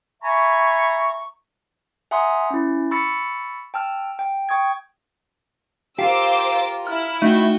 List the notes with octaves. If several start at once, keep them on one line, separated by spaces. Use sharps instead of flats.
E5 G#5 A#5 B5 C#6
E5 F#5 G#5 A#5 C6 D#6
C#4 E4
B5 C#6 E6 A6 C#7
G5 A5 E6 F6
G5
G5 C#6 D#6 G#6
F4 G4 A#4 C5 F5 D6 E6
E4 F6
A3 D#4 F#4 G5